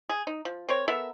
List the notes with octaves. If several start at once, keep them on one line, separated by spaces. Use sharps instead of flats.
G#4
D#4
F3
C4 A#4 C#5
B3 A4 A#4 E5